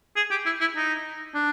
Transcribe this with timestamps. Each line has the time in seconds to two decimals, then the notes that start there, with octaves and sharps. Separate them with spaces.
0.16 G#4
0.31 G4
0.46 E4
0.61 E4
0.76 D#4
1.34 D4